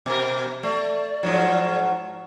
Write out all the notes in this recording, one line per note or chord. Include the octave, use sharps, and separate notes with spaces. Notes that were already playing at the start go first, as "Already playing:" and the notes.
B2 A#4
A3 D5
G#2 F3 F#3